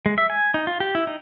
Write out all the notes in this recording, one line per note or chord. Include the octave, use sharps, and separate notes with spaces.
G#3
E5
G#5
D#4
F4
G4
E4
D#4